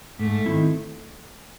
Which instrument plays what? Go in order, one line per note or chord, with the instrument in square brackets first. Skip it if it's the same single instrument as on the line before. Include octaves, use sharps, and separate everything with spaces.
[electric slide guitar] G#2 [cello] A3
[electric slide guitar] D#3 G3 C4 E4